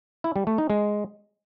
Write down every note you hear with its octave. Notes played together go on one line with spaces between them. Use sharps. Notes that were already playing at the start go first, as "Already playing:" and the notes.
E4
G3
A3
D#4
G#3